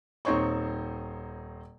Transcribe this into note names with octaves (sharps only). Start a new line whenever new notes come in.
D#1 C4 D#4 C5 C#5 C#6